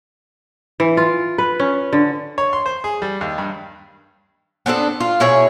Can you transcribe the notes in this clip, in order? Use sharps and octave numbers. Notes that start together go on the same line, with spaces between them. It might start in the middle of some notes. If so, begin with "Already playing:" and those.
E3
F4
B4
C#4
D3
C#5
C6
C5
G#4
G3
D#2
G2
B3 C4 D4 A4
F4
B2 E4 G#4 C#5